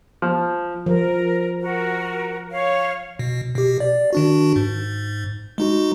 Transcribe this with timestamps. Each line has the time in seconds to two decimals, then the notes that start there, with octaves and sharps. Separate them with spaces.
0.22 F3
0.86 F3 A#4
1.60 F#4 A#4
2.51 C#5 F5
3.19 B2
3.55 B2 G4
3.80 D5
4.13 D#3 D4 F#4
4.56 G#2
5.58 G#3 D#4 F#4